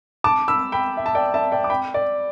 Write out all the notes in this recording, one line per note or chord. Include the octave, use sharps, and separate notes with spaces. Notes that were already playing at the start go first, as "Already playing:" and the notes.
A5 D6
B5 E6
G5 B5
E5
A5
D5 G5
E5 A5
D5 G5
D6
G5 B5
D5